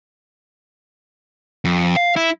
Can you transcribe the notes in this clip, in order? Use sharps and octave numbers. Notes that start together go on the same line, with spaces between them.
F2
F5
E4